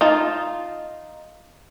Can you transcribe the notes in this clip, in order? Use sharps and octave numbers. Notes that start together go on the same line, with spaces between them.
D#4 F4 A5